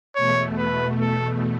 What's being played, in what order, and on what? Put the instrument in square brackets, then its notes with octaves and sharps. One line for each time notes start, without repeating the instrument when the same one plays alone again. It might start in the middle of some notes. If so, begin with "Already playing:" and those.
[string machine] E2 B2 A3 [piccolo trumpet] C#5
[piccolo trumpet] B4
A4